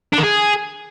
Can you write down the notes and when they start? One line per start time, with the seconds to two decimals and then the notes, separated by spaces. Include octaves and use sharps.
0.13 D4
0.18 D#3
0.23 G#4